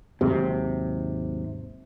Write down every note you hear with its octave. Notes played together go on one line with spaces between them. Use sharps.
D#2 G#2 C3 F#3